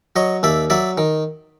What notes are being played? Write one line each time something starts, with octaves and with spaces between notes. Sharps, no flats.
F#3 C#5 D#5
D#2 D5 E5
F#3 D5 E5
D#3